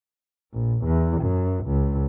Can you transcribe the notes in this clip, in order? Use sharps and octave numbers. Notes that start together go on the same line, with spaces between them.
A#1
E2
F#2
C#2